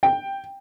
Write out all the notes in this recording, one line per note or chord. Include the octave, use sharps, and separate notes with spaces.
G5